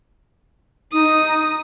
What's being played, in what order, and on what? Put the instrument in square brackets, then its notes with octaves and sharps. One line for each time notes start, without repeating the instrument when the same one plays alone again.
[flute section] D#4 [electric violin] D#6